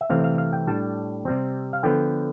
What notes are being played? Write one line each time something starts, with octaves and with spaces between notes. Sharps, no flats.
E5
C3 E3 A3 C4 F5
F5
F5
G5
A2 G3 D4 A5
C3 G3 C4
F5
D3 F3 B3 G5